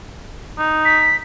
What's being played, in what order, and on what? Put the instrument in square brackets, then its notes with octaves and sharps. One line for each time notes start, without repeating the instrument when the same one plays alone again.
[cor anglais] D#4
[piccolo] B6